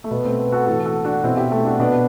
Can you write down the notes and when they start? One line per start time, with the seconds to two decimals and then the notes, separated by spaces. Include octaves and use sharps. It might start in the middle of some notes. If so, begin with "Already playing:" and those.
0.04 A3
0.11 B2 B3
0.25 A3 C4
0.39 B3
0.52 F#4 A4
0.67 A2 E3 F#4 A4
0.85 F#4 A4
1.05 D4 F#4
1.23 B2 C4 E4
1.37 E4 G4
1.52 A3
1.65 D4 F#4
1.79 B2 B3 D4